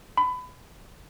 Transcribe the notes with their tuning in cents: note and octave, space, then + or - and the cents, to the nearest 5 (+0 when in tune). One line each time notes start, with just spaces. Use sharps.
B5 +25